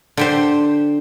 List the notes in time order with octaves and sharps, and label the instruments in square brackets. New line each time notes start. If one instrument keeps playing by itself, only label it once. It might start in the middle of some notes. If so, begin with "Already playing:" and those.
[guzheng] D3 G4 C5